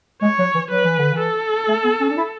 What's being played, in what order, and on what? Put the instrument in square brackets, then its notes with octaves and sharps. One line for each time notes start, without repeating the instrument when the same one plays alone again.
[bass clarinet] G#3 [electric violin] C#5
[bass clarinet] F#3
E3
[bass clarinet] F#3 [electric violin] B4
[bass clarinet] E3
D3
E3
[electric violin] A4
[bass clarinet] A3
B3
C#4
D4
E4